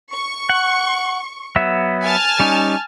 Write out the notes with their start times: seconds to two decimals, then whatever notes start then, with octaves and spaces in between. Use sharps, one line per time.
0.14 C#6
0.49 F#5
1.56 F#3 B3 E5
2.03 G#5 A5 F6
2.40 G3 C#4 D#4